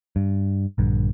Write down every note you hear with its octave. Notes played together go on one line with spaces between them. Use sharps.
G2
A#1 G2 D3